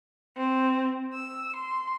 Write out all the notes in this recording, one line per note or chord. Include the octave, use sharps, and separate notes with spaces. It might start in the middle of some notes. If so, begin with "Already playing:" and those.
C4
E6
C6